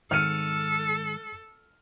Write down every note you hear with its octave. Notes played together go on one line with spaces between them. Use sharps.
G#2 D#3 A4 F6 C#7 D#7